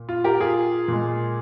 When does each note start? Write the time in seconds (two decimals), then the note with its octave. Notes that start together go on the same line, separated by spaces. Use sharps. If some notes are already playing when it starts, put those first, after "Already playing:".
Already playing: A#2
0.09 F4
0.24 G4 A#4
0.40 F4 G#4
0.88 A#2 G#3